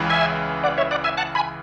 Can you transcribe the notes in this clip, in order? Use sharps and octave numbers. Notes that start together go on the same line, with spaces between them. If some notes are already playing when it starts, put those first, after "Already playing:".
Already playing: C#2 C#3 E3
E5 G#5
D5 F#5
C#5 E5
D5 F#5
E5 G#5
F#5 A5
G#5 B5